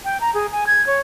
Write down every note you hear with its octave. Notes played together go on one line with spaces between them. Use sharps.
G5
A#5
G#4
G#5
G#6
C#5